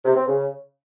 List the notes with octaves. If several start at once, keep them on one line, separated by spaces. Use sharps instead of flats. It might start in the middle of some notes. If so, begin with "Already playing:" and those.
C3
C4
C#3